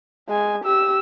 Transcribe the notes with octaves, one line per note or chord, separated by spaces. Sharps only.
G#3 G#5
G4 E6